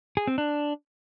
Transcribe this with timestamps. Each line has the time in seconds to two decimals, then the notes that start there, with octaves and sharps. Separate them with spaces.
0.17 G#4
0.27 C4
0.38 D4